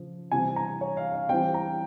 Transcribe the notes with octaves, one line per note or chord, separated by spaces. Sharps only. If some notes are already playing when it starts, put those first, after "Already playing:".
Already playing: C#3 F3
C3 E3 G3 C4 G#5
A#5
C#5
F5
F5
E3 G3 C4 G5
A#5